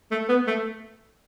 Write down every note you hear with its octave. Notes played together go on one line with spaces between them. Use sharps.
A3
B3
A3